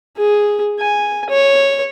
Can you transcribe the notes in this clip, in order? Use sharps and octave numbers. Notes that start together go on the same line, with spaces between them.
G#4
G#5
C#5